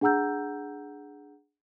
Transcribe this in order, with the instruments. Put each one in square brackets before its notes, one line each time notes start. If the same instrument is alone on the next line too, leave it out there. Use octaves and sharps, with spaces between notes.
[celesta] D4 G#4 F#5 A#5 E6 G6